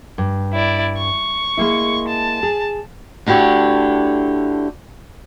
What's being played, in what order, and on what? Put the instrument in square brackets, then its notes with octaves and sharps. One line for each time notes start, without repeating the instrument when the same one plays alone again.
[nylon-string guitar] G2
[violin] E4 D5
C#6
[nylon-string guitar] G#3 A#3 E4
[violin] A5
[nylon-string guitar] G#4
[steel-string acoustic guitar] D2 D3 E4 G4 C#5